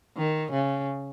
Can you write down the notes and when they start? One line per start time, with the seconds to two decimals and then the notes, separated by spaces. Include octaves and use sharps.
0.17 D#3
0.52 C#3